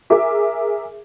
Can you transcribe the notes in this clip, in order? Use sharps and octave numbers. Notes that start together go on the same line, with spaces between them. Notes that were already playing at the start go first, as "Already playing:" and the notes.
G#4 A#4 E5 D6